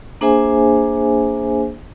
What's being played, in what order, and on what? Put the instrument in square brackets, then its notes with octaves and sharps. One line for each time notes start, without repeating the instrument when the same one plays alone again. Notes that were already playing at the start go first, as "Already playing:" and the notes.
[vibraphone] A#3 D4 G#4 C5 E5 G#5